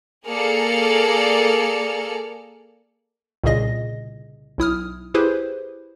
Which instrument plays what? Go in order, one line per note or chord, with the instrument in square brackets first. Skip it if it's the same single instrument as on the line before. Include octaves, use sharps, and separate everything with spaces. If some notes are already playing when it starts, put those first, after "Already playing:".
[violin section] A#3 G#4 A4 D5 F6 C#7
[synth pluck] C2 A#2 C#3 G#4 D#5 A#6
B1 E4 D#6 F6
E4 G4 G#4 B4 C5